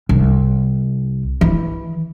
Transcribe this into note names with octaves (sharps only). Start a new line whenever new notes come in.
C2
E3